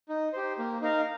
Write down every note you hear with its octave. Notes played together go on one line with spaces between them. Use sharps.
D#4
G4 C5
A#3
D#4 A#4 F5